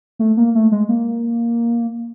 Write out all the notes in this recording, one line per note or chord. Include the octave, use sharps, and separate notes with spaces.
A3
A#3
A3
G#3
A#3